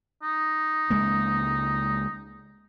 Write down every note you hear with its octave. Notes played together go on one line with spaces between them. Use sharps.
D#4
C#2 G#3 A#3